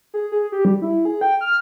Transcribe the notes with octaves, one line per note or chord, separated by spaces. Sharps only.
G#4
G#4
G4
G3
E4
G#4
G5
F6